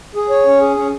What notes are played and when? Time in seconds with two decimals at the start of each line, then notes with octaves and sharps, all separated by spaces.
0.15 G#4
0.30 C#5
0.46 C#4
0.60 G#4
0.77 C#4